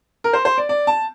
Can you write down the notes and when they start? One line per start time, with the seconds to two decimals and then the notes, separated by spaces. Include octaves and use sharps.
0.24 A#4
0.33 C5
0.45 C5
0.58 D5
0.69 D5
0.87 A5